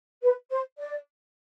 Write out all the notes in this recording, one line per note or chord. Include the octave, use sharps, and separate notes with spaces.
B4
C5
D5